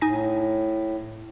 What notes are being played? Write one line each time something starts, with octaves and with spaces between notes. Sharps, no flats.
A2 D#4 G#5 A#6